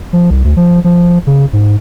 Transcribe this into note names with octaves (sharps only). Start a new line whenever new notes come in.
F3
C2
D2
F3
F3
C#3
G#2